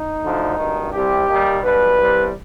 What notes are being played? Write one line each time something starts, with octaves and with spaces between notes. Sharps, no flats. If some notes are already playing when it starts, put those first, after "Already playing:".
Already playing: D#4
D2 D3 F3
G#1 G2 D#3
C2 C3 G3 G4
D#2 D#3 G3
B1 B2 G3 B4
C2 C3 G3